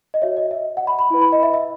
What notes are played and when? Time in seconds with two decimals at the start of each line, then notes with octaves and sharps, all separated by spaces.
0.14 D#5
0.22 F#4 C#5 E5
0.37 D#5
0.51 E5
0.77 F#5
0.87 B5
0.99 B5
1.10 E4 B4
1.21 B5
1.32 D#5
1.43 E5
1.54 E5